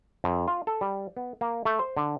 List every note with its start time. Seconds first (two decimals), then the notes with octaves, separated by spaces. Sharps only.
0.24 F2
0.48 F4
0.67 A4
0.81 G3
1.17 B3
1.41 A#3
1.65 A3
1.79 C5
1.97 D3